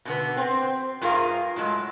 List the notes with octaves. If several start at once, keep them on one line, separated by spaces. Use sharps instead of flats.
B2 D3 B3
C4
G2 F4 G#4 A#4 F5
A2 F#3 G#3